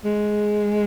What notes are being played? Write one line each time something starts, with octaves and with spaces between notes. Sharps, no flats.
G#3